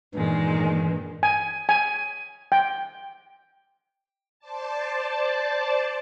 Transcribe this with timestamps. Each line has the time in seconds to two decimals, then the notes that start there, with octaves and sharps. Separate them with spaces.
0.15 G2 A#2 D#3 E3 G#3
1.23 G#5
1.69 G#5
2.52 G5
4.39 C5 D5 A5